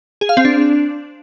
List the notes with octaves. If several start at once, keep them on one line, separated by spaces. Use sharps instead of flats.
G#4
F5
C4
D4